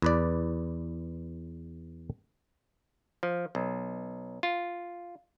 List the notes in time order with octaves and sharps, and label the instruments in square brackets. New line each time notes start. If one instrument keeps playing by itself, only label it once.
[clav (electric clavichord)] E2 B4 D5
F3
B1
F4